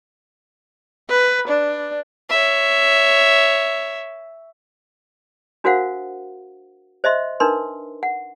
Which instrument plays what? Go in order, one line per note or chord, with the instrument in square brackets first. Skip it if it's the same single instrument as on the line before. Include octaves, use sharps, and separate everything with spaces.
[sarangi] B4
D4
[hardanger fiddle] C#5 E5
[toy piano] D4 F#4 A#4 C5 F5 F#5
C5 D#5 E5 C6
D4 D#4 A#4 B4 C6
F#5